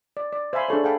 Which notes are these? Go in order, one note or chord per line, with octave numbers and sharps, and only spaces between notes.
D5
D5
C5 E5 F5 G#5 B5 C6
D4 G#4 A4 C#5
G#4 A4 F5 G5 A5 B5